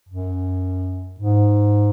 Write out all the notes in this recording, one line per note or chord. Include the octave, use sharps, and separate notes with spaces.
F#2
G#2